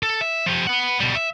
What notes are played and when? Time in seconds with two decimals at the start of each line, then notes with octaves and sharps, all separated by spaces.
0.03 A4
0.21 E5
0.46 F3 G4
0.67 B4 F#5
1.00 B2 G3
1.15 E5